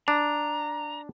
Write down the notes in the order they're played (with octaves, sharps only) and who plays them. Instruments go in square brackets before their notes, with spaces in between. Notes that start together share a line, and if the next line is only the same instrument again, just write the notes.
[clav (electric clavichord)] D4 [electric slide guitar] A#5